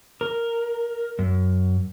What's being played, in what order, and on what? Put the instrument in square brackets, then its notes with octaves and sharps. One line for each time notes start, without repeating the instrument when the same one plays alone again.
[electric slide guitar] A#4
F#2